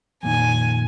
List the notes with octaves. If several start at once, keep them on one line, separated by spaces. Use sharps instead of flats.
F2 A#2 D#3 G#5